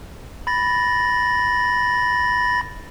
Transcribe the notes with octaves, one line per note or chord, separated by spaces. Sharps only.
B5 A6 A#6